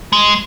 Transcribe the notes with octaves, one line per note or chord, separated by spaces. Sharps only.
G#3